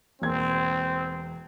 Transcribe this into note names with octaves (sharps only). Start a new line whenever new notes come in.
E1 A#3 C4 G#6